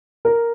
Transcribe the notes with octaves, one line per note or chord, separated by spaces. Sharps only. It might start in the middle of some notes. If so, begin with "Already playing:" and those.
A#4